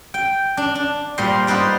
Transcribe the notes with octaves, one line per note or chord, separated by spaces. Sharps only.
G5
D4
D4
A#2 G3 C5 C6
B3 D#4 B4 C5 D5